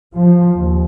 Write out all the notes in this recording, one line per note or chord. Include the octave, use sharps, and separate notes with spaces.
F3
D#2